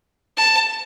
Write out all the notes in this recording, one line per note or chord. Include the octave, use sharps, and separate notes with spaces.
A5